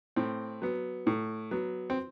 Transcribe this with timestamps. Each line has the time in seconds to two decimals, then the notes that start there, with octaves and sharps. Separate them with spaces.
0.16 A2 C4
0.62 F#3 B3
1.07 A2
1.51 F#3 B3
1.90 C4